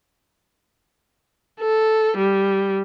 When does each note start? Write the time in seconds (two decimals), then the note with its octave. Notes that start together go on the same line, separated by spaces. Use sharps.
1.60 A4
2.18 G3